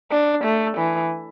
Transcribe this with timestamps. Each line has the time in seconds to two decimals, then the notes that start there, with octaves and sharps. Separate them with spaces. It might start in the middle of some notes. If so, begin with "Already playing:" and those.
0.11 D4
0.44 A3
0.77 E3